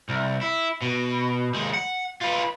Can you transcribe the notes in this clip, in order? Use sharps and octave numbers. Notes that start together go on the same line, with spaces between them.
C2
E4
B2
D#2 G#3
F#5
F4 B4